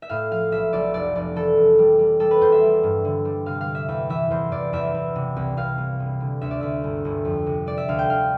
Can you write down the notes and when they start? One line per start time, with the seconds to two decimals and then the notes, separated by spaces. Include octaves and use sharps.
0.02 E5
0.09 A2 F5
0.31 F3 F5
0.52 B1 E5
0.73 B1 D5
0.94 F1 D5
1.15 F1 D5
1.36 E3 A4
1.57 F1
1.79 G3
1.99 G3
2.20 G3 A4
2.31 B4
2.41 E2 C5
2.52 E5
2.63 G3
2.84 G2
3.05 D3
3.25 G3
3.46 C3 F5
3.61 F5
3.68 G3
3.75 E5
3.88 E2 E5
4.10 E3 E5
4.30 E2 C5
4.51 E2 D5
4.73 E2 E5
4.95 E2
5.16 C3
5.36 C2
5.57 C2 F5
5.78 C2
6.00 E1
6.20 D3
6.41 D2 E5
6.51 D5
6.61 D2 E5
6.84 G1
7.05 G1
7.25 F2
7.46 C3
7.67 G3 D5
7.78 E5
7.88 D2 F5
7.99 G5
8.10 D2 F5